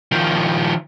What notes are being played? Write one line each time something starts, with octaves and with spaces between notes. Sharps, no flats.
D#3 F3